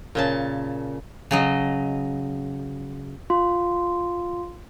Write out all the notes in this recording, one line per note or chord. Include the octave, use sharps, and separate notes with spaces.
A#2 C#3 A5
C#3 F#3 D#5
F4